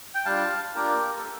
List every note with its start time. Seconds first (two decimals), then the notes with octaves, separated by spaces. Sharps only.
0.15 G5
0.25 G3 D4 F4 F5 A5
0.75 A#3 D4 F4 G4 A#4
1.18 A4